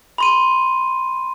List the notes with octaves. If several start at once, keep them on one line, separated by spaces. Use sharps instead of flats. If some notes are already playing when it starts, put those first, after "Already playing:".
B5 C6 D#7